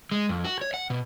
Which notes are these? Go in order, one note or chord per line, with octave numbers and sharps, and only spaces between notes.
G#3
F2
F#4
C#5
F#5
B2